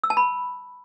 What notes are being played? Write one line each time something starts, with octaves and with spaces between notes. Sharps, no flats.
E6
A5
B5